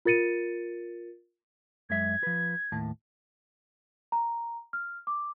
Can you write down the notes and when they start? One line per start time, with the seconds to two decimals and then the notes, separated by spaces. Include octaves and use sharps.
0.05 F4 A#4 A6 C#7 D#7
1.90 F#2 G#3 E5 G#6
2.23 F3 B4
2.72 D#2 A2 A5
4.12 A#5
4.73 F6
5.07 D6